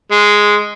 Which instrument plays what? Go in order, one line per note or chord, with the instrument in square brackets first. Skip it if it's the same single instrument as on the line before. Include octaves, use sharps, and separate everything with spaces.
[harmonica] G#3